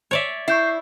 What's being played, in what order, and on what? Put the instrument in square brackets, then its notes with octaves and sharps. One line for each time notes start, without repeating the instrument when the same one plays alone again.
[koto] C#5 D5 E5
[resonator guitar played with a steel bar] E4 [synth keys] C#6 G6 C7